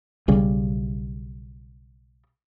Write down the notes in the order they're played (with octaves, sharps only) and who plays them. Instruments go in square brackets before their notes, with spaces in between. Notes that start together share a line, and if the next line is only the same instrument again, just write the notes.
[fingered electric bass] B1 C#3 G3